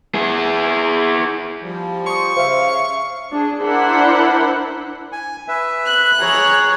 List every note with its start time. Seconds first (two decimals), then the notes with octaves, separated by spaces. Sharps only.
0.15 E4 G#4
1.61 F3 G3
2.06 C6 C#6 D#6
2.37 C#3 C5 E5 F5
3.32 D4 G#4
3.63 D4 E4 A#4 C5 F#5 B5
5.12 G#5
5.48 B4 E5
5.86 F#6
6.21 G#4 C#5 A#5